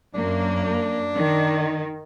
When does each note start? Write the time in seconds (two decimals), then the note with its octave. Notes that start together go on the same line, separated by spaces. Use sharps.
0.14 F#2 A#3 D4
1.15 D#3